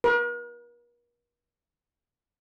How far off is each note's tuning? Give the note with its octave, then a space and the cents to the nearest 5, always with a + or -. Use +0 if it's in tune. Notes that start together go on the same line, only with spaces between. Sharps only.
A#4 +45